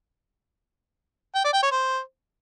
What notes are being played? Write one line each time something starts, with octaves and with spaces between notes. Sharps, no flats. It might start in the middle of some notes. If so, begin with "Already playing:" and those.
G5
D5
G5
C#5
C5